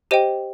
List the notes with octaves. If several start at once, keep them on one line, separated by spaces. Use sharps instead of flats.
G4 C5 D#5 G5 D#7